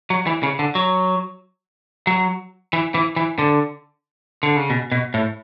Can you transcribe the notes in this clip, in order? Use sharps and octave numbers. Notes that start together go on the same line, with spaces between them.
F#3
E3
C#3
D3
F#3
F#3
E3
E3
E3
D3
D3
C#3
B2
B2
A2